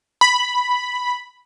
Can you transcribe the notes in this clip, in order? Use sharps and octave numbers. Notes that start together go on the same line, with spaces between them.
B5